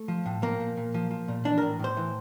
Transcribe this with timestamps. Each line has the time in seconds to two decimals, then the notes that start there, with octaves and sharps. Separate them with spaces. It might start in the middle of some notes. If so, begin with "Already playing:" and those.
Already playing: A3
0.08 F3
0.26 A2
0.42 F3 A#3
0.60 A#2
0.77 A#2
0.94 F3
1.11 F3
1.28 A#2
1.45 E3 D4
1.58 A2 A#4
1.79 A2 C5
1.97 E3